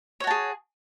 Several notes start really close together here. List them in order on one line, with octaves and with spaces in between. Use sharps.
C#5 F#4 A5 G#4